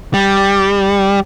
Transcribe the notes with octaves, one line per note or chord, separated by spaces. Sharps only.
G3